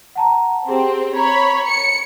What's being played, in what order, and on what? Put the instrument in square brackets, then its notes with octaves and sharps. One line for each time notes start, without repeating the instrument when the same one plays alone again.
[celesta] F#5 A5 A#5
[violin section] C4 [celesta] G4 G#4
[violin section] C#5 B5 [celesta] A#5
[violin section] C#7